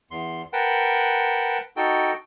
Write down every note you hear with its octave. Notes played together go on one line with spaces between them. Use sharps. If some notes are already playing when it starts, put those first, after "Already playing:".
E2 C6
A#4 B4 F#5 G5 A5
D#4 F#4 A4 G5